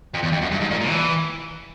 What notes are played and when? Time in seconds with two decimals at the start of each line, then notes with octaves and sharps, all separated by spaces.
0.14 F2
0.23 E2
0.32 F2
0.42 F#2
0.51 G2
0.61 G#2
0.71 A#2
0.81 A#2
0.89 E3